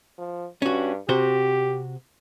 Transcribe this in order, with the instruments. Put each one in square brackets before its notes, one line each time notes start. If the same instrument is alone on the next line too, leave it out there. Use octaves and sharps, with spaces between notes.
[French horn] F3
[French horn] G2 [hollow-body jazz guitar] C#4 F#4
[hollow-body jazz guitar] C3 F#4 C5 [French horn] G4